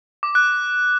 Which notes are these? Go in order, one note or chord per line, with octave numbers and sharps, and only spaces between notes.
D6
F#6